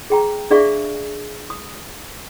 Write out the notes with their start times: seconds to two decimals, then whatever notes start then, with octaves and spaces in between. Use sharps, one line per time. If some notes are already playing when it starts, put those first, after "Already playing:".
0.10 G#4 G5 A#5
0.50 D4 G#4 D5 E5 F5 C#6
1.50 D#6